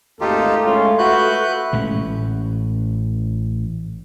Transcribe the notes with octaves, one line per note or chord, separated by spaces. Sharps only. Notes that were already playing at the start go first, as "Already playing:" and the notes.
G#1 D#2 A3 D#4 F4 G4 A4
A2 G#3 C#4 F4
F#4 B4 E5 F#5 F#6 G6
A1 A2 G#3 C#4